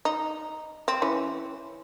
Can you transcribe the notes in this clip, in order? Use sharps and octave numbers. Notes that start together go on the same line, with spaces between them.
D#4
C4
E3 C#4